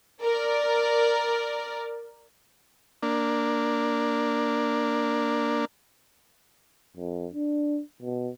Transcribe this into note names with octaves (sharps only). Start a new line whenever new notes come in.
A#4 D5
A#3 D4
F2
D4
B2